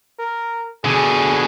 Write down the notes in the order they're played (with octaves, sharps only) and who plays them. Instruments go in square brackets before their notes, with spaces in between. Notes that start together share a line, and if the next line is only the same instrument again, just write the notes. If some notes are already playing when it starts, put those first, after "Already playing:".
[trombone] A#4
[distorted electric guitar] B2 D3 [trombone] G#4